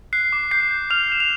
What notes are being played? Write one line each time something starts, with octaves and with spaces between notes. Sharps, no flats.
F#6 C7
D6
G6 C7
G6
F6 G6 F7
G6 E7
F7